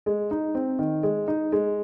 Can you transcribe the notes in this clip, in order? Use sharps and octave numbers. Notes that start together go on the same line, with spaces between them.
G#3
D#4
C4
D#3
G#3
D#4
G#3